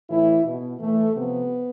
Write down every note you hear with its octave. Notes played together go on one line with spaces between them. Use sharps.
A2 E3 E4
B2
A2 E3 A3
C3 F3 B3